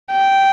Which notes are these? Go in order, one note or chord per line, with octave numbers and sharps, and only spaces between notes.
G5